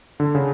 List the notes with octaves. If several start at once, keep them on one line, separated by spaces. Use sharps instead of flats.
D3
C#3